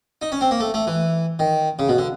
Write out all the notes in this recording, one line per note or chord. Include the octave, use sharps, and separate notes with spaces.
D#4
C#4
C4
A#3
A3
A3
E3
D#3
C#3
B2
D3